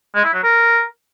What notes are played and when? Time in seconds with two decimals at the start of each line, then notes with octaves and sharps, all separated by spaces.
0.15 G#3
0.24 E4
0.34 F#3
0.43 A#4